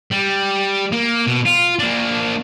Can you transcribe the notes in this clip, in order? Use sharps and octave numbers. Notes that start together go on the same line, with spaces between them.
G3
A#3
B2
F4
A#3 D4